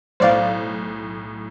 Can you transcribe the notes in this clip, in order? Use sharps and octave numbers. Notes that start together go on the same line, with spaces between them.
B1 A2 C5 D5 F5